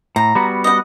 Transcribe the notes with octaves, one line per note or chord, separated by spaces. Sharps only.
A2 A#5
G3 B3 F#4
D#5 F#5